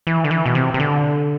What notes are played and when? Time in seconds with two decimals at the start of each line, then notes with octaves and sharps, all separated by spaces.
0.07 E3
0.24 D3
0.31 E3
0.46 B2
0.55 C3
0.74 C3
0.80 D3